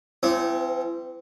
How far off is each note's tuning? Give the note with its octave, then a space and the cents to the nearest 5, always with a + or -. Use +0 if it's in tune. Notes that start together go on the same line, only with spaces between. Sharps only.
E3 +40 C4 -15